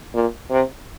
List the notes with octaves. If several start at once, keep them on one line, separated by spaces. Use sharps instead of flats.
A#2
C3